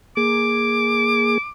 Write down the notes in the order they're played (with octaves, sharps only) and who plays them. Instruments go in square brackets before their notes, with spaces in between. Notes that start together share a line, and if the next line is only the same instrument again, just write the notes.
[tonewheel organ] A#3 G#4 [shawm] D6